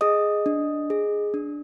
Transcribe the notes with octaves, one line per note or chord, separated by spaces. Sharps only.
G#4 D#5 D#6
D4
G#4
D4